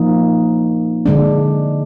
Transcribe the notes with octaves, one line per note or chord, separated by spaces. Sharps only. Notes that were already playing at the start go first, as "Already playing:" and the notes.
Already playing: F3 A#3 D#4
D3 G#3 D4